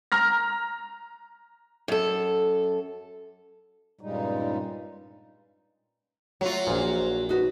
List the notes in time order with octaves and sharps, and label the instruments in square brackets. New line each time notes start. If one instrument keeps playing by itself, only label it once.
[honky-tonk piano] A#5 F6 A#6
[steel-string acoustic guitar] F#2 A4
[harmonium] G2 A#2 C#3 G3 G#3 D#4
[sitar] F#3 F4 [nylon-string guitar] A3
[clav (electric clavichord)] A#1 A#2 [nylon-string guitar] C5
[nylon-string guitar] D#4 F#4 B4